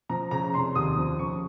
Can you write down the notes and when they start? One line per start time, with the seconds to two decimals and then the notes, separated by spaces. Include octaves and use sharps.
0.09 F3 A#5
0.31 C#3 A#5
0.54 F1 C6
0.75 D#2 D#6
0.97 F3
1.19 C#3 C#6